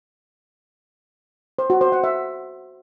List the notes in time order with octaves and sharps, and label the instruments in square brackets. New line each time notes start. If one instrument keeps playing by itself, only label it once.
[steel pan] C5
F#4
C5
F#5
E5